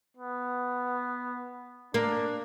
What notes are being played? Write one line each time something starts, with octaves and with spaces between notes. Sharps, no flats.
B3
A#3 D4